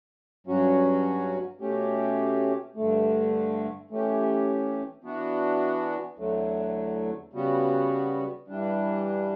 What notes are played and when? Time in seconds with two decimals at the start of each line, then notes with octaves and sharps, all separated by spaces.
0.47 G2 F#3 C#4 F#4
1.61 B2 A3 C#4 G4
2.76 G2 D3 A3
3.90 E3 A3 C#4 G4
5.04 E3 B3 D4 F#4
6.19 E2 D3 F#3 A3
7.33 C#3 G3 B3 F#4
8.48 G2 E3 G3 D4